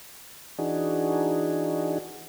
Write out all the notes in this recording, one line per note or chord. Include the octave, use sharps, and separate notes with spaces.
E3 D4 D#4 F#4 G#4